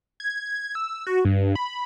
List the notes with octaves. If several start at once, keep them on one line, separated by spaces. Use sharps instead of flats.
G#6
E6
F#4
G2
B5